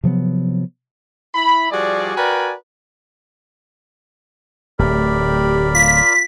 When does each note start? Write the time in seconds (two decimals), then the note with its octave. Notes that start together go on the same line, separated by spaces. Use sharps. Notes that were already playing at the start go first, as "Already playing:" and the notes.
0.04 C3 F3 F#3 B3
1.35 E4 B5
1.72 F3 G3 F#4 G#4 D5
2.16 F#4 A#4 B4 D5 G5 G#5
4.79 D1 A3 G4 A#4 D5 B5
5.75 F4 B6